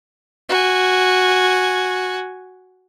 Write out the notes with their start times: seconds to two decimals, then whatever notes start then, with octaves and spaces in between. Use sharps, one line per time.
0.49 F#4 G#5